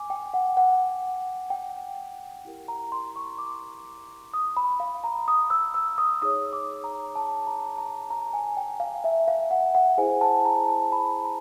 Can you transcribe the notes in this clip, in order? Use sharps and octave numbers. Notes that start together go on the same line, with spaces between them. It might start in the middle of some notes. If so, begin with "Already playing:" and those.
Already playing: G#5 D6
G5
F#5
F#5
G5
E4 G4 A#4
A#5
C6
C#6
D6
D#6
B5
F5
A#5
D#6
E6
E6
D#6
D#4 G#4 C#5 D#6
D6
A#5
A5
A#5
A#5
A#5
G#5
G5
F5
E5
F5
F#5
F#5
E4 G#4 C5 G#5
A5
A#5
A5
B5
A#5